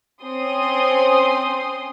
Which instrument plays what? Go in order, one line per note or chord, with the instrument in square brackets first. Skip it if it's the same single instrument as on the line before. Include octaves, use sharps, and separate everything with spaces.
[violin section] C4 C#4 C6 D#6